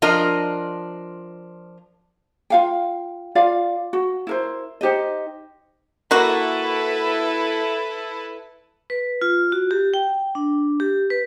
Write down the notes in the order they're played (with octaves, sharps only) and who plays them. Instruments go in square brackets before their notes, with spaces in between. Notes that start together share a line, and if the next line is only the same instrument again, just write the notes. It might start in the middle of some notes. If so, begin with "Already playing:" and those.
[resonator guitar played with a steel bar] F3 D4 F4 A#4 D#5
[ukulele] F4 F5 G5
F4 D5 F5
F#4
E4 A#4 C5
D#4 G4 C5 D#5
[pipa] A#3 F#4 [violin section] E4 A4 B4
[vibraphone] B4
F4
F#4
G4
G5
D4
G4
B4